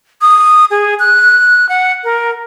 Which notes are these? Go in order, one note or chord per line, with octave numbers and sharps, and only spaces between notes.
D#6
G#4
F#6
F#5
A#4